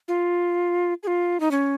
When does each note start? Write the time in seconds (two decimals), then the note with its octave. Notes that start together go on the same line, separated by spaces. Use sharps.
0.08 F4
1.03 G#4
1.07 F4
1.40 D#4
1.51 C#4